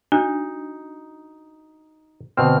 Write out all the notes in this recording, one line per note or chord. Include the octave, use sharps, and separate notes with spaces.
D4 D#4 F#4
B2 D3 C4 F6